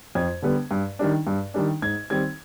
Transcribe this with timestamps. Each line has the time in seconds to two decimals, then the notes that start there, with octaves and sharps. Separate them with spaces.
0.15 F2 G#6
0.42 D3 G3 B3
0.71 G2
0.99 D#3 G3 D4
1.27 G2
1.54 D#3 G3 D4
1.82 G#2 G#6
2.10 D#3 G3 C4 G#6